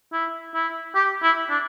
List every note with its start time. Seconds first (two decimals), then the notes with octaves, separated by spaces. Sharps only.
0.13 E4
0.54 E4
0.95 G4
1.23 E4
1.50 D4